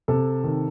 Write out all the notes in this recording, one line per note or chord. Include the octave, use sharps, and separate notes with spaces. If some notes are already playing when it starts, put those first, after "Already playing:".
C3 A4
D#3